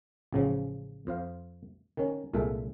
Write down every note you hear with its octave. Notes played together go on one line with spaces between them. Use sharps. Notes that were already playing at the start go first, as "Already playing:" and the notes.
A1 C#3 F3
F2 C5 F5
D#3 C#4
C2 A#2 G#3 A4 E5